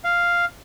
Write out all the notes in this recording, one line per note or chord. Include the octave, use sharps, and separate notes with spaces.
F5